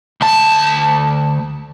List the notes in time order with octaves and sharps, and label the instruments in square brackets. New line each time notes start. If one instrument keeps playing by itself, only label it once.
[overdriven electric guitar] D2 A5